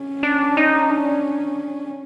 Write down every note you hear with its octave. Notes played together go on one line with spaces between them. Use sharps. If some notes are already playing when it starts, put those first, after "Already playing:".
Already playing: C#4
D4
D#4
D4
C#4